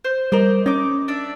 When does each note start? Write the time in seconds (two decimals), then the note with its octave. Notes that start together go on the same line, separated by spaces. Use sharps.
0.05 C5
0.32 G3 A#4 C5 D5 D#5
0.66 C#4 D#4 D6
1.08 D4 D5 E5